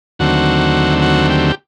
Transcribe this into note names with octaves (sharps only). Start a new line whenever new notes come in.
D#2 D3 F#3 A3 C4 F#4
F#4
G4